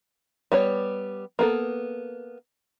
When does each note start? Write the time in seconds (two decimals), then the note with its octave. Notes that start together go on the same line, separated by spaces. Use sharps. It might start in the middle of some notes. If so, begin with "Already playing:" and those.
0.52 G3 B3 C#5
1.39 A#3 B3 A4